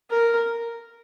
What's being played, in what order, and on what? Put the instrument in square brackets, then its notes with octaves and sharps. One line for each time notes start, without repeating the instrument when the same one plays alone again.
[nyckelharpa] A#4